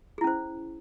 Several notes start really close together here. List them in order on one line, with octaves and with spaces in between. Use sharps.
G#4 E4 C#4 C5